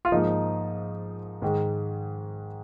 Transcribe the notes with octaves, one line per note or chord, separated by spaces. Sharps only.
F4
G#2 F3 A#3 D#4
G#2 D#3 G#3